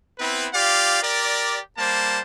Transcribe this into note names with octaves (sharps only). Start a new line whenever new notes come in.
B3 C4 E4 B4
F4 G4 D5 F5
G4 A#4 D5
G3 A#3 C5 A5